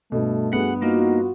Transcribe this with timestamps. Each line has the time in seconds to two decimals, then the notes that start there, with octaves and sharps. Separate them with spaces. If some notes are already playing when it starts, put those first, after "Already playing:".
0.12 G2 B2 A3 A4
0.53 G2 B3 F#4 G#4 F#5
0.82 A#3 D#4 F4 F#4